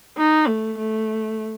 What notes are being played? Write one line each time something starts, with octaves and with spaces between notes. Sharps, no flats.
D#4
A3
A3